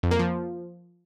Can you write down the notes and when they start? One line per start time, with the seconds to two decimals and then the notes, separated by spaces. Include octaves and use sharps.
0.03 F2
0.11 A#3
0.19 F3